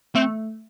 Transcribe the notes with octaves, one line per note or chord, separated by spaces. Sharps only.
A3 C4